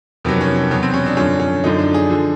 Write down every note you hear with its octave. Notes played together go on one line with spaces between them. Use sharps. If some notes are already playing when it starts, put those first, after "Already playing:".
F2 C3 D#3 F#3 B3
C#4
C#4
E2 B2 F#3 B3
C4
C#4
D4
F#2 D3 F3 C#4
C#4
F#2 D3 F3 D#4
D4
G#4
D3 F3